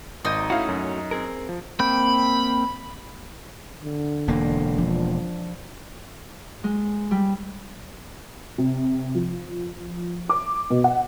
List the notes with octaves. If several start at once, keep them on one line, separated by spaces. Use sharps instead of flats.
G#1 D#4 G6
A3 C#4 E4 F#4 F5
F#2
C4 G#4 A#4
F3
A#3 C4 G5 B5
D3
E1 A#3
F3 D4
G#3
G3
C3
F3
D6
B2
F#5